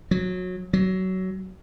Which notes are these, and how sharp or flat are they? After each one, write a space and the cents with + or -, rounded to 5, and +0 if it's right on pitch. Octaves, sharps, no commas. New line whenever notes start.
F#3 -20
F#3 +20